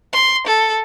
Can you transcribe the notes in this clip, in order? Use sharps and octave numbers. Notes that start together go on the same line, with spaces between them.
C6
A4